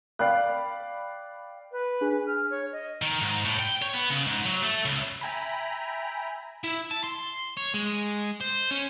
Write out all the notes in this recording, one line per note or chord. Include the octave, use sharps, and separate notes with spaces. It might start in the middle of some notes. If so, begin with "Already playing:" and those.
D5 F5 G5 B5 F#6
B4
D4 G#4 G#5
F6
C#5
D#5
D#3
G#2
A2
G5
C#5
B3
C#3
G#2
F#3
A3
C#2
E5 G5 G#5 A#5 B5
E4
A5
C6
C#5
G#3
C5
C#4